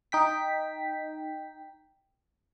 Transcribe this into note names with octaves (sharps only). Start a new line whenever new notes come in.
D#4 G5 B6